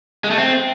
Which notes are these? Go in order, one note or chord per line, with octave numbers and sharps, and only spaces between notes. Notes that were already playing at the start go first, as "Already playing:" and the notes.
G#3
A3
C4